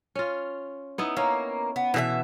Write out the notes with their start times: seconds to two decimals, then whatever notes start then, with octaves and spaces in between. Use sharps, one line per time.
0.15 C#4 F4
0.98 B3 D#4 E4
1.17 A#3 C#4
1.76 B3
1.94 B2 E3 G#4 E5